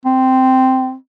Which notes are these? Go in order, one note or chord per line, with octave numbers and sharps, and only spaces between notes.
C4